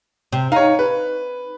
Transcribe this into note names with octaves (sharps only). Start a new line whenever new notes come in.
C3
D#4 C#5 F5
B4